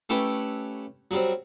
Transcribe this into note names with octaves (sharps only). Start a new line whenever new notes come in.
A3 C#4 E4 G4 B4 E5
F#3 G3 C4